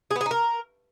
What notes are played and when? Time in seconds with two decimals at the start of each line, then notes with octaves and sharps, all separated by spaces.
0.11 G#4
0.16 B3
0.21 G#4
0.26 D#4
0.31 A#4